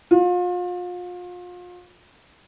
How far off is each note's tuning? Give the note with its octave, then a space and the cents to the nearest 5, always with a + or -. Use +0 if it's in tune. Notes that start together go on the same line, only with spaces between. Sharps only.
F4 +35